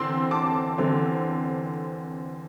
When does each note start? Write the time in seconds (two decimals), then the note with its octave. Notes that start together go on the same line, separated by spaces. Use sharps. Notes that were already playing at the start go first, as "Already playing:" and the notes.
Already playing: E2 D3 C4 C6 E6
0.31 A5 D6
0.78 E2 D3 C4